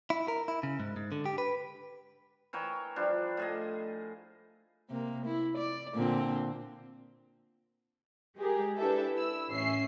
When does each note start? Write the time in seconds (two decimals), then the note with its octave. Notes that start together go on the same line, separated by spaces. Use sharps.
0.10 E4
0.28 A#4
0.48 E4
0.63 C#3
0.80 G#2
0.96 G#2
1.12 D3
1.26 G4
1.38 B4
2.53 E3 A#4 C#5 G5
2.96 F3 G3 D4
3.37 A2 G#4 D#5
4.90 C3 A#3
5.26 E4
5.58 D5
5.95 A#2 D3 C4
8.37 G#3 G4 G#4 A#4
8.77 D4 E4 G4 A4 B4 E5
9.13 E4 E6
9.50 A1 C#4 E5 C7